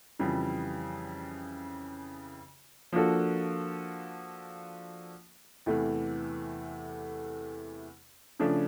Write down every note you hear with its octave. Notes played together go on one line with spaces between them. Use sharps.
F2 C#3 E3 G3
F3 A#3 D4 F#4 A4
E2 C3 E3 A3
C#3 F3 A3 D4